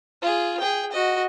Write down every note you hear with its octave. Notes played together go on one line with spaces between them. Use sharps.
F4 G#4
G#4 G5
F#4 D#5